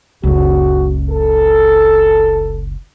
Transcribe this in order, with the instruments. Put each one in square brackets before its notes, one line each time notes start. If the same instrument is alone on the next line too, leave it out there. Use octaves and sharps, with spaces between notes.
[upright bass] F#1 C#2 [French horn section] F#4
[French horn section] A4